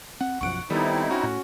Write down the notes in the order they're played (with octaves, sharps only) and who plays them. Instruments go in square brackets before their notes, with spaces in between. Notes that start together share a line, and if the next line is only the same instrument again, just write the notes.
[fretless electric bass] C4 [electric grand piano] F#5
[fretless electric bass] B1 F#2 F3 [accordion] F#5 [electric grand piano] C#6 D7
[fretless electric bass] D#3 [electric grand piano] G3 B3 A4 [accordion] C4 D#4 E4
[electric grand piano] C#4 F#4
[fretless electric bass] A2